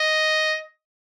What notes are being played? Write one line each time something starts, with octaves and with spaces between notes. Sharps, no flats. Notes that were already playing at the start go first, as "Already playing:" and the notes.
Already playing: D#5